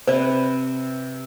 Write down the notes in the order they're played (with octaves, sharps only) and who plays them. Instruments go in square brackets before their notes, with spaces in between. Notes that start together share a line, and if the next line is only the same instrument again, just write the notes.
[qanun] C3 B4 [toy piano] C5 D5